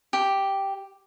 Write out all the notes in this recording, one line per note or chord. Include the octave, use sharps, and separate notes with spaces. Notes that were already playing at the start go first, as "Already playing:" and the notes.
G4